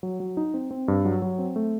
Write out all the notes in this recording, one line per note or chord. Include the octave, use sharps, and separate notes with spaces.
F#3
F#3
D#4
C4
C4
G2
F#3
F#3
C4
A3